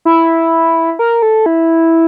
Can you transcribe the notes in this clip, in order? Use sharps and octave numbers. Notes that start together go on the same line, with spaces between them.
E4
A#4
A4
E4